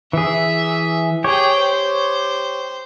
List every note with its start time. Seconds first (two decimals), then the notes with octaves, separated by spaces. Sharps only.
0.13 E3 G#4 E5
1.24 G4 G#4 C#5 G5
1.57 C5